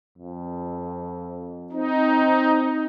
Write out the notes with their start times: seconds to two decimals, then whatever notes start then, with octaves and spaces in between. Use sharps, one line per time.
0.18 F2
1.72 C4 D#4